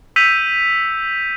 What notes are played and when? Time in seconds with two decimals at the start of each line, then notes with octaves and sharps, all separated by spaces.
0.16 E6 G6 B6 C#7 D#7 F7